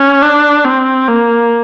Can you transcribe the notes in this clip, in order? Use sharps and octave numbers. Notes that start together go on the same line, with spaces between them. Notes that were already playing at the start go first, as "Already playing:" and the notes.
Already playing: C#4
D4
C4
A#3